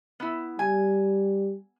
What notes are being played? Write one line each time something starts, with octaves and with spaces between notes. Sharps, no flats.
B3 E4
G3 G#5